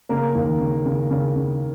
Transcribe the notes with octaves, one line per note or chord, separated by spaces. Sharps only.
C#3 A#3 A#4
D#2
C#3
C#3
C#3
C#3